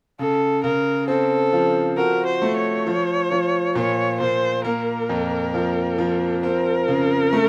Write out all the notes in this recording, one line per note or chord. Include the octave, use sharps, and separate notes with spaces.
C#3 A4
C#3 A#4
C4 A4
F3
F#4 A#4
C5
A3
C#5
F3
F3
A#2 C#5
A#2 C5
A#3 A#4
F2
F3
F3
C4 A#4
C#3
A3